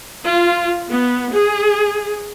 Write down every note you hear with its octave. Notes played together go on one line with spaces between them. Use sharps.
F4
B3
G#4